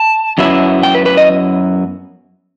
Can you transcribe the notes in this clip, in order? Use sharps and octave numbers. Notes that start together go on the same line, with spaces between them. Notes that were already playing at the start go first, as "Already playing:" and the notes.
Already playing: A5
F#2 F#3 B3 E4
G5
B4
B4
D#5